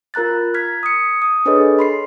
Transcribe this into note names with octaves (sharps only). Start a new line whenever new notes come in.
F4 A#4 A#5 F#6 A6
F6 G#6 B6
D#6 C#7
D#6
D4 G#4 A4 B4 C#5 D#5
B5 C6 C7